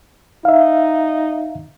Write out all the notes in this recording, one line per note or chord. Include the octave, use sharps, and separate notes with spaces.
D#4 E5 F5